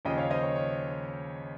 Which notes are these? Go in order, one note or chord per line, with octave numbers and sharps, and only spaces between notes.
D#2 C#3 F3 D#5 G5
C#5 F5
C5 D#5
C#5
C#5